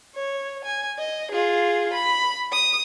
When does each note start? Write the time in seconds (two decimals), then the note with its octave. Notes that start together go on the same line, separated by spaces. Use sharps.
0.15 C#5
0.65 G#5
0.98 D#5
1.31 F4 G#4
1.93 B5
2.52 D#6